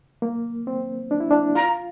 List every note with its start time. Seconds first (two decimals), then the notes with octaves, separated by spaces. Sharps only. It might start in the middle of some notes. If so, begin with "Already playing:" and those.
0.22 A#3
0.67 C4
1.11 D4
1.20 E4
1.31 D4
1.55 F4 A#5